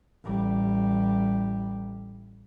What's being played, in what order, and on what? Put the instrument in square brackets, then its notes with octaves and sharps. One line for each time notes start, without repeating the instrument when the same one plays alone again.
[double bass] A1 G3